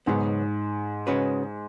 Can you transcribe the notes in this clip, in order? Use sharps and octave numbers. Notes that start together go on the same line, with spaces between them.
C#2 G#2 B2 F#3 B3
C#3 G#3 C#4 F#4 B4